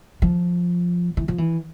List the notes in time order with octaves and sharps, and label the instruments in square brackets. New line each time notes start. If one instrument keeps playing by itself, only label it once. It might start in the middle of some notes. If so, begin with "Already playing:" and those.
[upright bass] F3
E3
F3
E3